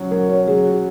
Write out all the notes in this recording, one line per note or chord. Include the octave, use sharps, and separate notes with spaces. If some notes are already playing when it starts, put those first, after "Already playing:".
Already playing: F#3 C#4
F#3 A#4
C#4 C#5
F#3 G#4
F#4